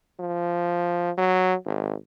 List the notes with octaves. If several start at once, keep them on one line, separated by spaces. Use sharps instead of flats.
F3
F#3
G#1